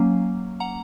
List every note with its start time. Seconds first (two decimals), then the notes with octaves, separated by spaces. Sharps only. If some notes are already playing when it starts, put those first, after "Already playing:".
Already playing: F#3 A#3 C#4
0.60 F#5 A#5